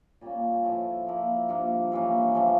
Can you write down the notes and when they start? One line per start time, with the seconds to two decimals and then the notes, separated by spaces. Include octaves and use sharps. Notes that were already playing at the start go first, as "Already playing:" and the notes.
0.21 A#2 G3 A#3 C#4
0.64 A2 F3 A3 E4
1.07 F3 A#3 E4
1.49 G2 F3 A#3
1.92 G2 E3 A#3 C#4
2.35 C#3 F3 A3 C#4